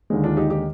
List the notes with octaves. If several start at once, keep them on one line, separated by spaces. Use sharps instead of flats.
D#2 D3 G#3
D4 F4
D#4 G4
D#4 G4